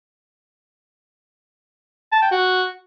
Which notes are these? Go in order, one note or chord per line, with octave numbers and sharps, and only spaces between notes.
A5
G5
F#4